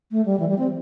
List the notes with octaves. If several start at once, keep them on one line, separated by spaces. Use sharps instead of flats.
A3
G3
E3
G3
C4